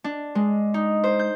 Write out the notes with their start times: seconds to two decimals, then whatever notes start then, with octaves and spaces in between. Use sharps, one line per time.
0.04 D4
0.35 G#3
0.74 D#4
1.04 C5
1.19 G6